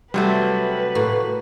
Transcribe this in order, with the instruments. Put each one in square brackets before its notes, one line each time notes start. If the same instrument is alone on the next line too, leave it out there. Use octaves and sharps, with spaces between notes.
[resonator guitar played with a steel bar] C3 F#3 A3 [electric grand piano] G3 [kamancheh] B4 [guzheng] E5 A5
[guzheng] A2 A#3 F#4